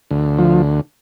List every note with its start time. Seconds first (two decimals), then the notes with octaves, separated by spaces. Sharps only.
0.11 D2
0.39 F3